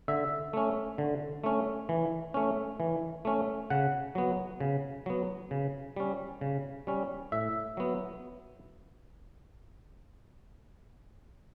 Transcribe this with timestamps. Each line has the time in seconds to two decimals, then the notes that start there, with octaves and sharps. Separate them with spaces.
0.08 D3 E5
0.53 A3 C#4
0.98 D3
1.44 A3 C#4
1.89 E3
2.34 A3 C#4
2.80 E3
3.25 A3 C#4
3.70 C#3 F#5
4.15 F#3 B3
4.60 C#3
5.06 F#3 B3
5.51 C#3
5.96 G3 C#4
6.41 C#3
6.87 G3 C#4
7.32 A2 E5
7.77 F#3 B3